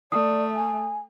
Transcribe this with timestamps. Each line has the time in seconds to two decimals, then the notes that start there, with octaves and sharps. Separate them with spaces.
0.12 A3 D5 D#6
0.55 G#5